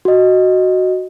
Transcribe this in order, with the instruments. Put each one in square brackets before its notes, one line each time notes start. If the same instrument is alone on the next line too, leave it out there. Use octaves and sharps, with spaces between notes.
[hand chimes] F#4 D#5